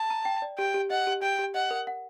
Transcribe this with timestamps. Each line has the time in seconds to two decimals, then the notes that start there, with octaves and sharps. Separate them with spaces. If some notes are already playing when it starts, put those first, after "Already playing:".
Already playing: A5
0.10 A#5
0.25 G5
0.42 D5
0.58 G4 G5
0.74 G4
0.90 D#5 F#5
1.07 G4
1.22 G4 G5
1.39 G4
1.54 D#5 F#5
1.71 A#4
1.87 F#5